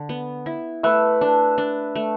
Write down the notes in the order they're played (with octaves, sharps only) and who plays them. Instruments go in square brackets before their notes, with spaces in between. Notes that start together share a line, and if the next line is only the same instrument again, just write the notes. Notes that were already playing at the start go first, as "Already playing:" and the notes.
Already playing: [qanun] D3
B3
E4
[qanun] A3 [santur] B4 E5
[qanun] D4
D4
A3